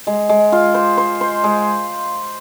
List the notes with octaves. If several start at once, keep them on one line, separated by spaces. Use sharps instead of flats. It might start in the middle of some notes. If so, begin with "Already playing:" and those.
G#3
G#3
F4
C5
C5
C5
G#3